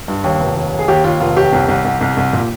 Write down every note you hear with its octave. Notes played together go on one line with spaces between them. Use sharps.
G2
D#2
F1
D#2
D#2
G#4
D#2 G4
D#2 F4
F1 F4
D#2 G4
C2
C2
C2
C2
C2
A#2